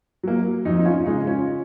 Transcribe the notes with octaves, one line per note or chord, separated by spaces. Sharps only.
F#3 A#3
F2 D#4
D#4
C#4 F4
C#3 G#3 D#4
C#4 F4